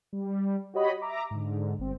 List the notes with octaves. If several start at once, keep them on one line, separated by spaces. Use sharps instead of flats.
G3
F#4 G4 C#5 D#5 B5
E5 A#5 D6
G#2 D3
G1 C4